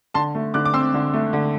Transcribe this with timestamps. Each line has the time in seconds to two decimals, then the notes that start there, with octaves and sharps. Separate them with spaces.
0.14 D3 A5 C6
0.35 A3
0.54 D3 D6 F#6
0.65 D6
0.74 C4 C6 E6
0.94 D3
1.13 A3
1.33 D3